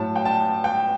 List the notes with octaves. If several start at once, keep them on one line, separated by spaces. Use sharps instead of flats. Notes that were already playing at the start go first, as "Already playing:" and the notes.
Already playing: A2 F#3 A5
G5
A5
G5